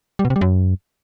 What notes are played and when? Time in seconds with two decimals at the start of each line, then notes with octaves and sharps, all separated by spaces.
0.19 G3
0.25 B2
0.30 C3
0.36 G3
0.41 F#2